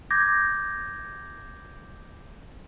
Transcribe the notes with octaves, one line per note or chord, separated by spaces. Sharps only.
D6 G6 G#6 A#6